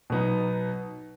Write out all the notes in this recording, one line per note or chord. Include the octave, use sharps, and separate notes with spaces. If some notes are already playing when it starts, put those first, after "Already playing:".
B2 F#3 B3 D#4